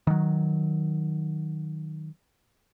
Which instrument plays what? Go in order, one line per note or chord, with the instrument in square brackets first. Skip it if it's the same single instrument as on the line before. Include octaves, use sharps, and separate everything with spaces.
[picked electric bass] D#3 F#3